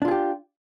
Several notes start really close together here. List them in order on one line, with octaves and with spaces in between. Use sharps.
D4 F4 G#4 G4